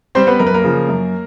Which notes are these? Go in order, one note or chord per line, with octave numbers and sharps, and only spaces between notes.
G3 C4 C5
B3 B4
F#2 A#4
B4
A#3 A#4
C#3 F3
F#2